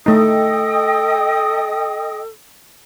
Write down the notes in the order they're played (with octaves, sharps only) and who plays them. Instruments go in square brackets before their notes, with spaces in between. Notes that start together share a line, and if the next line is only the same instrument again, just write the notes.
[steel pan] A3 D#4 [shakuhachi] A4 [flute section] D#5 G5 D#6